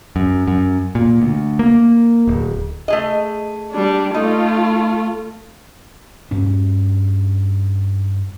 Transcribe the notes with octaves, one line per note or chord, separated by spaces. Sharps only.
F#2
F#2
A#2
D2
A#3
D1
A3 G#4 D#5
G3 D4
A3 D#4 F4
G2 C#4